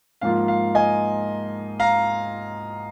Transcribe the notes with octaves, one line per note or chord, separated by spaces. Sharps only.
G#2 F3 A#3 F4 F5
F5
D#5 G#5
F5 A#5